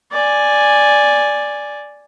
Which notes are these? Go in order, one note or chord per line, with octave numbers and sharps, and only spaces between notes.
D5 G#5